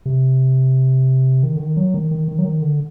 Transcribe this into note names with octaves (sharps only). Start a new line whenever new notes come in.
C3
D#3
D3
D#3
F#3
D#3
D#3
D#3
F#3
D#3
D3